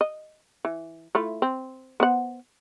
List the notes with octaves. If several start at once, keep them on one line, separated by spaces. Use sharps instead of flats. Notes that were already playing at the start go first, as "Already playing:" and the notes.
D#5
E3
A3 E4 F4
C4
B3 C5 F#5